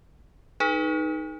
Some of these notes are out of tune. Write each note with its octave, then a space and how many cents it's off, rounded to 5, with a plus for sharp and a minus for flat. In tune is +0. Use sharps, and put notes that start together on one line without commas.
D#4 +0 G#4 +45 B4 -5